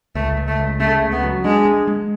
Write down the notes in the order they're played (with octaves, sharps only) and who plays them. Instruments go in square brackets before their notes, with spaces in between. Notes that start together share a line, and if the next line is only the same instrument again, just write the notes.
[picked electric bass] C#2 [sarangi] A3
[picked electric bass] C#2
[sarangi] A3
[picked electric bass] C#2
[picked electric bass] C#3 [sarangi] A3
[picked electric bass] C#2
[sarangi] B3
[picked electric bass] F#3
[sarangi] G#3 [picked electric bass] D4
[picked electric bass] G#3
G#3